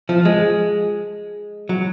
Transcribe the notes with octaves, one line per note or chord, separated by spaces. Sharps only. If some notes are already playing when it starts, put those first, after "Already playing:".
F3
G#3
F#3